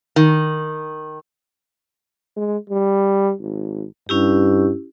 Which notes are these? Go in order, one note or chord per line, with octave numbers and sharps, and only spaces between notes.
D#3
G#3
G3
G#1
G2 C#4 E4 G4